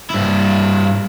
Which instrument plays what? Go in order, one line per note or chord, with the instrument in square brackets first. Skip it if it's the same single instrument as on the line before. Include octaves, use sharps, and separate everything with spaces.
[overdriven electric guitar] G2 E4